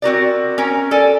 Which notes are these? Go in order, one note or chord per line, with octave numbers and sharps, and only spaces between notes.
C4 F#4 A#4 D5
C#4 A#4 A#5
A4 D5 G#5